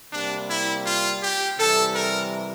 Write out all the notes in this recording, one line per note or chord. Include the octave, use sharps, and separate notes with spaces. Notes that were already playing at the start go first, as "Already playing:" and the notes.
C3 G3 A#3 D4
E4
F4
G4
C3 E3 G3 A4
A#4